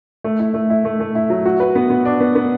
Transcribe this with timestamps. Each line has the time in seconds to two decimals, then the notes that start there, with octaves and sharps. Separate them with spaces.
0.24 A3
0.39 E4
0.54 A3
0.70 E4
0.85 A3
1.00 A3
1.15 E4
1.30 F#3
1.45 F#4
1.60 B4
1.75 B3
1.90 B3
2.05 D4
2.20 B3
2.35 B3